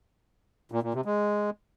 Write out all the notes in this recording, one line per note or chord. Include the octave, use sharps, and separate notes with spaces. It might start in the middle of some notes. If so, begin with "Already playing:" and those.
A#2
A#2
C3
G#3